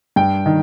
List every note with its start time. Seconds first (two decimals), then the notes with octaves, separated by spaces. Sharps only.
0.16 G2 G5
0.46 D#3